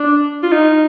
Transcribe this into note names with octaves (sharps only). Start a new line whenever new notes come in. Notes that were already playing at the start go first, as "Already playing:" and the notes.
Already playing: D4
F4
D#4